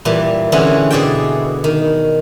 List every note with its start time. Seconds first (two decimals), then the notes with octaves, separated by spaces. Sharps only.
0.05 A#2 E3 G3
0.52 D3 E3 C4 C#4 E4 G#4
0.91 B2 G#4 D5 E5 G5
1.64 D#3